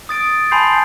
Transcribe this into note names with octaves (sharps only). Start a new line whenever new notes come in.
D#6 A6 D7
G#5 A5 B5 C6 G6 C7